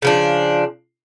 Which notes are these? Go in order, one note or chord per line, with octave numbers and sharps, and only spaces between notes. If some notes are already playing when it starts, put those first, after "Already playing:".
C#3 F3 D4